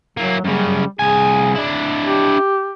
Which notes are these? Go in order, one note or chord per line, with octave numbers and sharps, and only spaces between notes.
F#3 A#3 E4
F#2 C#3 G3
C2 G#4 G#5
D4 E4
G4